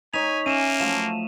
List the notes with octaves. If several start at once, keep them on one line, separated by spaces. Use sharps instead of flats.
D#4 C#5 G#5 B6 F7
A#3 C#4 E5 D#7 E7
F3 F#3 A3 E7